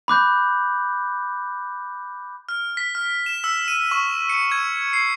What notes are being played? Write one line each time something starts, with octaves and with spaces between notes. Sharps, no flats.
B5 D6 F#6 G6
F6
B6
F6
E7
E6
D#7
C#6
C#7
G#6
C7